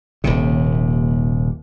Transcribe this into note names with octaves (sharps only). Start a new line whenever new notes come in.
D#1 D#2 C3